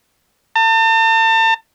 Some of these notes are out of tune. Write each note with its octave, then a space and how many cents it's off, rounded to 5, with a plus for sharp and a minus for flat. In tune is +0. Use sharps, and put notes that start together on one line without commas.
A5 +40